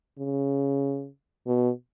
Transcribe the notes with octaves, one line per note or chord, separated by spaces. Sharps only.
C#3
B2